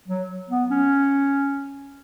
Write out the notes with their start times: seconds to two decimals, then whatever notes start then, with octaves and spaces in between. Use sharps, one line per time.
0.09 F#3
0.50 B3
0.71 C#4